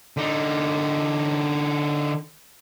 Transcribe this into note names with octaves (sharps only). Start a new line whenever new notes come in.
D3 D#4